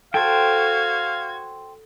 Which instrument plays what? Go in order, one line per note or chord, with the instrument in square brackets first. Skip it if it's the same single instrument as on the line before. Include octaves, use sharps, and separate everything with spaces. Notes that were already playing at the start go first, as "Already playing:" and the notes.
[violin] F#4 G#6 [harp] A4 [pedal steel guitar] C5 G5 [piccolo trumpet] F5